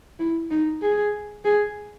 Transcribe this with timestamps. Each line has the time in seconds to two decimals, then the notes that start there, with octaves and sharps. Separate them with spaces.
0.19 E4
0.51 D#4
0.82 G#4
1.45 G#4